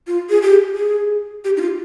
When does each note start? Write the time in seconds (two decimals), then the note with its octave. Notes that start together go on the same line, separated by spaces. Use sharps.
0.07 F4
0.30 G#4
0.42 G4
0.76 G#4
1.44 G4
1.57 D#4
1.61 F4